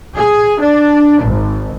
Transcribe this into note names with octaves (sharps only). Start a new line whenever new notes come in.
G#4
D4
G#1